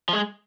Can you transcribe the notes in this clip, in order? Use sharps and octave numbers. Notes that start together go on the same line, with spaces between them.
F3
G#3